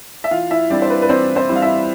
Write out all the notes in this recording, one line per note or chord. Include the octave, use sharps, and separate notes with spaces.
E5
E3 F4 F5
E4 E5
G3 C4 D4 E4 D5
C5
B4
B4
E3 C4 C5
C4 C5
G3 C4 E4
F5
E4 E5